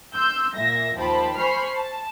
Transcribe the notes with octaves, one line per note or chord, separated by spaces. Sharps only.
C6 E6 G6
A#2 E5 A#6
D#2 F3 C5 G5 A5 B5
C5 G#5 B5 C#6 F6 C7
A5